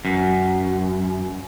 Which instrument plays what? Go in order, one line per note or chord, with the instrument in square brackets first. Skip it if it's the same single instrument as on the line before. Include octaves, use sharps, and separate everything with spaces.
[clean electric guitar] F#2